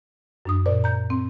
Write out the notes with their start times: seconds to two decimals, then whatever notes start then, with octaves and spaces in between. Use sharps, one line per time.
0.45 F#2 D4 D#6
0.66 A#2 C5 D5
0.84 A#5 G6
1.10 C4